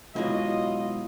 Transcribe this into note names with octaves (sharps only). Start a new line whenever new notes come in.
B2 F#3 G#3 E4 F4 D#5